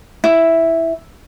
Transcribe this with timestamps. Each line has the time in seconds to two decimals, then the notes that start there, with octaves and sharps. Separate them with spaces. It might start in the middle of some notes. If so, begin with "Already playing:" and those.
0.24 E4